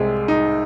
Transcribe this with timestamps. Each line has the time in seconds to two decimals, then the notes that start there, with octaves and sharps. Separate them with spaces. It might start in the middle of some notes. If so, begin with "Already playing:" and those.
Already playing: C2 C3 G#3 G#4
0.28 D#4